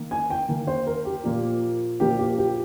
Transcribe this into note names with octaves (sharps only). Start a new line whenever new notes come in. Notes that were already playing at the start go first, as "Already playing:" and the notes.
Already playing: D#3 A#3
G#5
G5
D#3 A#3
C5
A#4
G4
A#2 F3 A#3
A#2 F3 A#3 G4
G4
G4